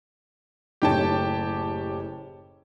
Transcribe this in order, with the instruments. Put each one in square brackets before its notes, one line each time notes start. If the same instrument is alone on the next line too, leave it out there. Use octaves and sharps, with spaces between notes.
[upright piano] F#1 A2 C#5 [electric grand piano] G4 G5 A5